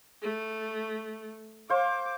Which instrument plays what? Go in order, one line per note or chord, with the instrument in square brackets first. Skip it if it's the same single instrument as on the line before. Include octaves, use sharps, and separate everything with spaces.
[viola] A3
[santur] C5 F5 [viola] D6